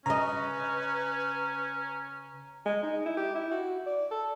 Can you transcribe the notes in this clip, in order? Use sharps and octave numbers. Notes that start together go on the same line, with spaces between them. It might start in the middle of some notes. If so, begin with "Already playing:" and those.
C#3 C#4 B4 D#5 A#5
G#3
D#4
E4
G4
E4
F#4
D5
A4